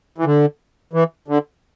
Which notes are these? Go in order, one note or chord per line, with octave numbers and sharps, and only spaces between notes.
E3
D3
E3
D3